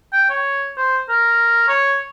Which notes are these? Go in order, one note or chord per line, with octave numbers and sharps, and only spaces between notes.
G5
C#5
C5
A#4
C#5